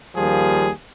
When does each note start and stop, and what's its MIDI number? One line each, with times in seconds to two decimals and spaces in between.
0.16 0.69 39
0.16 0.69 53
0.16 0.69 55
0.16 0.69 58
0.16 0.69 68